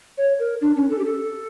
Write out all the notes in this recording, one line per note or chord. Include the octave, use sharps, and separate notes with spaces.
C#5
A#4
D4
C#4
A4
G4
A4